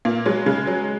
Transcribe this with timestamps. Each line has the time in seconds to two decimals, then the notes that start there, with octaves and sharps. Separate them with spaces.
0.05 A#2 A#3
0.25 F#3 G#3
0.46 C#3 G#3
0.67 F#3